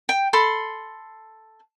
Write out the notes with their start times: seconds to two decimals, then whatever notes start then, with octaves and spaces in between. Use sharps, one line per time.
0.09 G5
0.33 A4 B5 C6